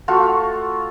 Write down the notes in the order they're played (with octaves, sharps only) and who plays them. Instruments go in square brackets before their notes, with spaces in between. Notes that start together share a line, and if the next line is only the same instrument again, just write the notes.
[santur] A3 F4 F#4